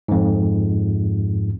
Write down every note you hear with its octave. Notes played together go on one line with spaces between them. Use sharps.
F2 G#2